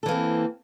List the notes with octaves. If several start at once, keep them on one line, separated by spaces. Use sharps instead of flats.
E3 A#3 C4 A4